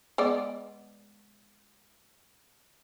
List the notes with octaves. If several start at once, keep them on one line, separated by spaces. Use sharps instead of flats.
G#3 B3 D5